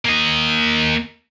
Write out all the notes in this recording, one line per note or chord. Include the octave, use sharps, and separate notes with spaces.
A#3 D#5